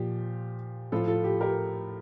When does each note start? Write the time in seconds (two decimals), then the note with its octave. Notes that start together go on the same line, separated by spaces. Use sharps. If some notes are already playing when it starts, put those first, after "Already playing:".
Already playing: A#2 F3 G4
0.92 A2 F3 F4 A4
1.08 F4 A4
1.24 G4
1.41 G4 A#4